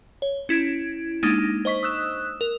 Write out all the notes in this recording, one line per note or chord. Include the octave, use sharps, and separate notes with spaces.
C#5
C#4 E4 G#6 D7
G#3 A#3 D4 D#4
C5 D#5 C#6 B6
D#6 E6 F#6 E7
A#4